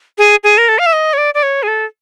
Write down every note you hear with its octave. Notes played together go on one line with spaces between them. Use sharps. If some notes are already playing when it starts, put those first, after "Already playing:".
G#4
G#4
A#4
A4
F5
E5
D#5
C#5
D5
D5
C#5
G#4
A4